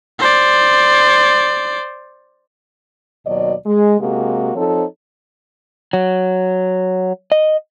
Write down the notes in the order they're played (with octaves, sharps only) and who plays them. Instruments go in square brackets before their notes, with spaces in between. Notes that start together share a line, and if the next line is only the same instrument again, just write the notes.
[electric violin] C5 D5
[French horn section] D#2 B2 F#3 D5 D#5
G#3
C3 G#3 A#3 F#4 G4
F3 C4 D#4 A4 C#5
[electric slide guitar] F#3
D#5